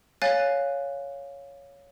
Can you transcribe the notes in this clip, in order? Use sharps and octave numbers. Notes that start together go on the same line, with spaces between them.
C#5 F5 G#5 F#6 A6 C7